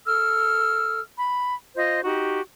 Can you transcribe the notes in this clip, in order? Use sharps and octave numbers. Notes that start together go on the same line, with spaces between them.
A4 E6 F6
B5
F4 C5 D#5
D#4 F#4 G4